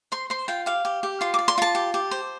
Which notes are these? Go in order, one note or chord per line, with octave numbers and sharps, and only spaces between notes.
C5 C6
C5 C6
F4 G5
G4 F5
G4
G4
F4 C6
D6
D5
C6
F4 A5
G4
G4
C5